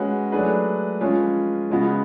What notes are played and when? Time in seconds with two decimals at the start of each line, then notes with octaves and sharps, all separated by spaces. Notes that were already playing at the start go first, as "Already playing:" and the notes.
Already playing: G#3 C#4 F#4 B4
0.32 F#3 A3 D4 G#4 B4
1.01 F3 G#3 C#4 F4 B4
1.70 C#3 G#3 B3 F#4